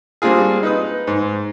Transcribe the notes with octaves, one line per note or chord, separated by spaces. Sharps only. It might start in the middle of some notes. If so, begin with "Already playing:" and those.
G3 A#3 C4 D4 F4 G#4
D#4 B4 D#6
G#2